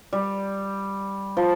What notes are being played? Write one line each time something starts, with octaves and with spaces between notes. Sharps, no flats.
G3
F3